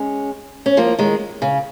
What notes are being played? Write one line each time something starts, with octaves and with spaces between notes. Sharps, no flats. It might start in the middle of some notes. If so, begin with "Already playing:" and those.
Already playing: G#3 C#4
C#4
F3 A#3
D#3 G#3
C#3